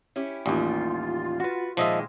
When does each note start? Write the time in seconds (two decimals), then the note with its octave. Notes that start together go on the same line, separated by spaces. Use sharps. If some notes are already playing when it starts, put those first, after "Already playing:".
0.16 C#4 E4 G4
0.46 A1 D#2 G3 F4
1.40 F#4 B4
1.77 A#2 D#3 F3 G#3 D#5 E5